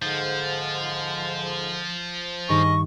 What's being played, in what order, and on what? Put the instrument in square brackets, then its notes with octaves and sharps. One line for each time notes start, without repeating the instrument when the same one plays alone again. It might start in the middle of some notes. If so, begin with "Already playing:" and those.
[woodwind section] G#2 D3 [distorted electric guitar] F3 [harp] A6
[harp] G2 D#3 [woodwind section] G#4 A#4 D#5 [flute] C#6